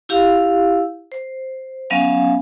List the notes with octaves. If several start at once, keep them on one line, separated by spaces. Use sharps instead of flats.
E4 G4 F5 E6
C5
F#3 B3 C#4 E5 F5 G#5